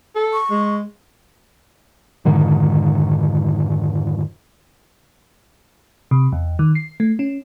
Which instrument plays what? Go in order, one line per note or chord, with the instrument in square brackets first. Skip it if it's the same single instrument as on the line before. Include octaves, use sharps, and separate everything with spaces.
[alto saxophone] A4
[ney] C#6
[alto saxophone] G#3
[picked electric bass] F2 G#2 D3 D#3
[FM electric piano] C3
E2
D#3
C7
A3
C#4